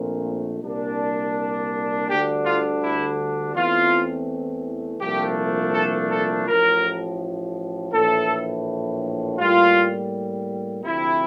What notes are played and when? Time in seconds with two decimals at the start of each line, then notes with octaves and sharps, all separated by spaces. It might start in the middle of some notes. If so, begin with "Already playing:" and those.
Already playing: A#1 A#2 A3 C4
0.62 C2 A#2 G3 D4
2.09 D2 D3 G3 D4 G4
2.45 F4
2.82 E4
3.55 E2 E3 A3 C4 F4
5.01 C2 A#2 F3 A3 D4 G4
5.74 A4
6.10 A4
6.47 A1 A2 F3 A#4
7.93 A#1 A2 E3 A3 A4
9.39 A2 G3 A#3 F4
10.85 D2 C3 F3 C4 E4